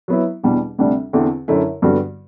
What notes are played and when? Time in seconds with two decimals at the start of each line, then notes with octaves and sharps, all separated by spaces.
0.08 F#3 B3 E4
0.43 E2 B2 G3 D4
0.78 D2 C3 G3 D4
1.13 E2 D3 A3 C4
1.48 F#2 D3 A3 E4
1.82 G2 D3 G3 B3 F#4